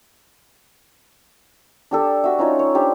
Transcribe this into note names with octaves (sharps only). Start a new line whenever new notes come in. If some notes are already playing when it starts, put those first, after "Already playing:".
D4 G4 A4
F#4 E5
C#4 D#4 F4 C#5
C#5
D4 G4 C5